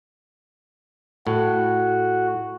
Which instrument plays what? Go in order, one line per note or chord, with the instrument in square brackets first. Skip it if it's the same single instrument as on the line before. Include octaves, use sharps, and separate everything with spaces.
[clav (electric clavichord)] A2 [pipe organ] F#4